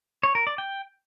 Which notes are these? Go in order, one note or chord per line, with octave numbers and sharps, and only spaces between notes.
C#5
A#4
D5
G5